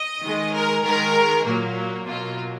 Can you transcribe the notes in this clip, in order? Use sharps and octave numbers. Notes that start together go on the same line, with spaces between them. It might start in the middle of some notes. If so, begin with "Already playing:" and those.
Already playing: D#5
D#3 G#3
A#4
D#3 G#3 A#4
A#2 F#3 A#3
B2 F#3 A#3 F4